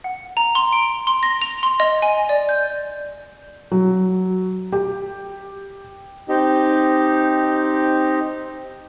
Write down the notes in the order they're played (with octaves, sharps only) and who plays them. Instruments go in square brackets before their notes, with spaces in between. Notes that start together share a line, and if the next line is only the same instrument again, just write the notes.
[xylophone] F#5
A#5
C6
D7
C6
A#6
F7
C6
D#5
G#5
D5
G6
[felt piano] F#3
G4
[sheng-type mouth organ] C4 D#4 G4